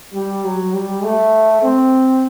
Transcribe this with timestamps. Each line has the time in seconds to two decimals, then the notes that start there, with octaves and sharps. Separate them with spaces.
0.13 G3
0.44 F#3
0.73 G3
1.03 A3
1.62 C4